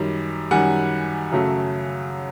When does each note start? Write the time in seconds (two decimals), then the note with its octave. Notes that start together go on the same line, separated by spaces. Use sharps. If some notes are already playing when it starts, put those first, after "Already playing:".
Already playing: F#2 D#3 G3
0.51 F#2 D#3 G3 F#5 G#5
1.32 F#2 C#3 F#3 A3